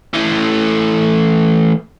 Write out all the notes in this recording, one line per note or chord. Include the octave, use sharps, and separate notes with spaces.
E3 A3